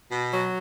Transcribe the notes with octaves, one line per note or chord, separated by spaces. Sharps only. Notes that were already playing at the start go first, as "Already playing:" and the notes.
B2
F#3